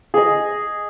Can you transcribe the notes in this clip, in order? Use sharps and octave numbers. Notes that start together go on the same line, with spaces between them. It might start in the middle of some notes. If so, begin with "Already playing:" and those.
G#4 D#5